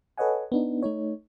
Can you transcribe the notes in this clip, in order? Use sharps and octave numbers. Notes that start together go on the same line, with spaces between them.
A4 B4 C#5 D#5 F#5 G#5
B3 D4 D#4
A3 D#4 C#5